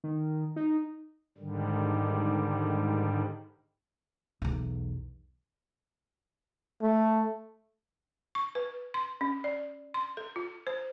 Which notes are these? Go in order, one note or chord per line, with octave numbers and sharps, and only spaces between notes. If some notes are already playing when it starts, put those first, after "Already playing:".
D#3
D#4
G#2 D3 D#3 G3
B1 E2
A3
C#6
B4
C6
C#4
D5
C6
A4
F4
C5